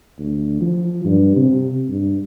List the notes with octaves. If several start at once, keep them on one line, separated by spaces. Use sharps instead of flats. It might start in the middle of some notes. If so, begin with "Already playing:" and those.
D2
F3
G2
C3
G2